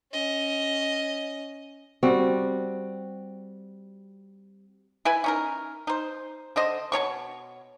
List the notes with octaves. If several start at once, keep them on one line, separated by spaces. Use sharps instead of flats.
C#4 D#5
G3 C4 F#4
E4 B4 G#5
C#4 D#4 A#4
D#4 C5
D3 C5 D#5
B2 D4 C#5 C#6